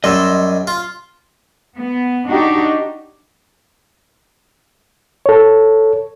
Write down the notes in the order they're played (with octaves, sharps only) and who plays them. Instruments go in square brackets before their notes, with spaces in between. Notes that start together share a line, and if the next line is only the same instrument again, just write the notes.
[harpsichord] F#2 G3 [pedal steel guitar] D#5 C6 E6
[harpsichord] F4
[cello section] B3
D4 D#4 F#4 G4
[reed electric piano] A4 C#5